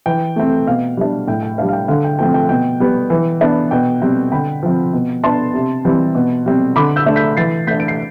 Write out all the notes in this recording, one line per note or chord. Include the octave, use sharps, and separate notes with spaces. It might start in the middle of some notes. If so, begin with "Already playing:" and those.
E3 G5
A3 C4
B2 F5
G3 D4
A2 G5
G5
G3 D4 F5
F5
G5
D3 F5
G5
F3 A3 C4 G5
G5
B2 G5
G3 B3
E3
B3 D4
B2 G5
G3 C4
D3 G5 B5
F3 C4
B2
B3 D4 A5 C6
C3
E3 G3 C4
B2
G3 C4
D3 B5 D6
E6 G6
A3 D4
G6 B6
E3 A6 C7
A3 D4 G6 B6
D7
C7